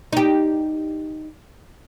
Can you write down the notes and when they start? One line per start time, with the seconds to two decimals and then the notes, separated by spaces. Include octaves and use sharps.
0.13 D#4 G4